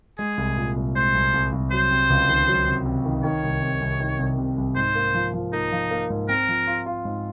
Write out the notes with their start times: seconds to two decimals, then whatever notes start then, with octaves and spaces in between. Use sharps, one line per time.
0.19 G#3 G#4
0.37 C2
0.57 A#2
0.76 C2
0.95 G#3 C5
1.14 C2
1.34 C2
1.52 C2
1.71 F#3 C5
1.91 C3
2.10 C#2
2.29 D#3
2.48 F#3
2.66 C3
2.86 C3
3.05 D#3
3.24 D#3 C#5
3.43 C2
3.62 C3
3.81 C2
4.00 D#3
4.19 C2
4.38 C3
4.58 C2
4.76 G#2 C5
4.95 A#3
5.14 F3
5.34 F3
5.53 A#3 D#4
5.72 F3
5.91 A#3
6.10 G#2
6.29 C4 A#4
6.48 F3
6.67 F4
6.86 F4
7.05 G#2